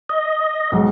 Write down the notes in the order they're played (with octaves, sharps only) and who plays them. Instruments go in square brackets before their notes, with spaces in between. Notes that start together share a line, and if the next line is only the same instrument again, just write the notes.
[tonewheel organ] D#5
[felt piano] B1 G#2